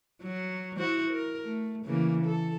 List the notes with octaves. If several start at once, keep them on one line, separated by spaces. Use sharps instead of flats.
F#3
E4 F#4 C5
A#4
A3
C#3 E3 A#3
A4